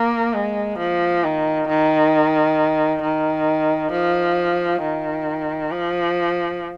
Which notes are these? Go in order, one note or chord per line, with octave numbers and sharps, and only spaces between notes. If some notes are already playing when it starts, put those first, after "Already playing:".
Already playing: A#3
G#3
F3
D#3
D#3
D#3
F3
D#3
F3